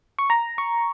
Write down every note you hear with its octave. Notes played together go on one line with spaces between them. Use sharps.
C#6
A#5
C#6